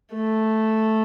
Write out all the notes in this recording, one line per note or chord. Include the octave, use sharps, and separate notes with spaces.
A3